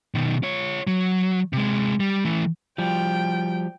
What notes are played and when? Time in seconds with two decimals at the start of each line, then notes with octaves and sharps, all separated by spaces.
0.15 B2 D#3
0.43 F4 C#5
0.87 F#3
1.53 C3 G#3
2.00 G3
2.25 E3 A3
2.78 F3 G3 G5